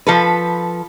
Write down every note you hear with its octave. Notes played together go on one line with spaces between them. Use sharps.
F3 A4 B4